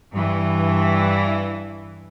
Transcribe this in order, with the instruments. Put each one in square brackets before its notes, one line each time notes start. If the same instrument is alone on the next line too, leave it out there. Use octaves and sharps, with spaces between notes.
[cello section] G2 E3